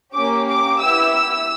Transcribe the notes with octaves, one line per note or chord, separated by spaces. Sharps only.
A#3 C#4 G4 D6
D6
B3 E4 G4 E6
E6